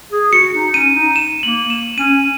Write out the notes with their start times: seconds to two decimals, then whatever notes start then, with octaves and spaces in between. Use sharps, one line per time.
0.12 G#4
0.32 F#4 C#7
0.54 D#4
0.74 C#4 D#7
0.94 D#4
1.16 E7
1.43 A#3 F#7
1.70 E7
1.98 C#4 D#7